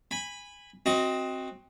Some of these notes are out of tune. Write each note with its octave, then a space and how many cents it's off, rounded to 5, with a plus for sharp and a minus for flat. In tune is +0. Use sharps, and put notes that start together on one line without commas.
G#5 -15 B5 +5
C4 +10 F#4 +0 D#5 +20